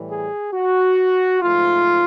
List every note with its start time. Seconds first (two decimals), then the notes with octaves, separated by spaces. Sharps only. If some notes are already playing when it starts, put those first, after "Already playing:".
Already playing: A2 E3 G3
0.10 G#4
0.53 F#4
1.42 G#2 F3 A3 F4